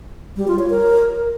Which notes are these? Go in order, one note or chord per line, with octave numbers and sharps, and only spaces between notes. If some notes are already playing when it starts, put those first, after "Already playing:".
G3
F4
C#5
A#4